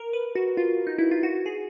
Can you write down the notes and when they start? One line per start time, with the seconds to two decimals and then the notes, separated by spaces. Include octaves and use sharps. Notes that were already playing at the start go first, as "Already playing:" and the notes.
Already playing: A#4
0.13 B4
0.35 F#4
0.57 F4
0.87 D#4
0.98 E4
1.11 F4
1.23 F#4
1.46 G#4